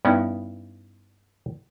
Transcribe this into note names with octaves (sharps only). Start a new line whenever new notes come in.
G2 B3 C#4 D#4 E4